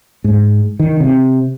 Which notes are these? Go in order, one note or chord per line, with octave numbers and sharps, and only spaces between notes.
G#2
D#3
C3